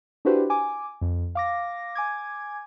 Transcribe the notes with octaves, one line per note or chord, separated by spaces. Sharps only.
D4 E4 F#4 G4 B4 C5
G#5 D6
F2
F5 D6 A#6
G#5 D6 G#6